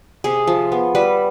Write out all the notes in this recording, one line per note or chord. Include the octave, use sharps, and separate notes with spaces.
C3 G#4
F3
B3
G3 B4